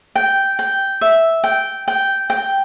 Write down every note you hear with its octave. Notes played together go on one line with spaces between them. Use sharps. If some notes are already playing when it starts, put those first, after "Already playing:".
G5
G5
E5
G5
G5
G5